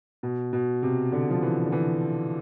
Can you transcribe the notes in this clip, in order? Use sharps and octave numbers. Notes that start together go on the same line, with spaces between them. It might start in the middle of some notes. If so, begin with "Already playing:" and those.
B2
B2
C3
D3
F3
E3
D3
E3